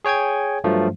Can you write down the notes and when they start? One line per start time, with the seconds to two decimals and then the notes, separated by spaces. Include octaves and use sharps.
0.05 G#4 C#5 G5 G#5 G#6
0.64 G2 F3 F#3 A3